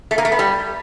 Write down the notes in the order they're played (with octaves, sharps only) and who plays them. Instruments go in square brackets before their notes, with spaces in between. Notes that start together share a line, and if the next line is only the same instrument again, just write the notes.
[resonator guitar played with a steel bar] A3
A#3
A3
B3
G3